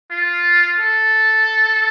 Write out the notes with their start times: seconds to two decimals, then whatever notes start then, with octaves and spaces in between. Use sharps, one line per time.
0.11 F4
0.80 A4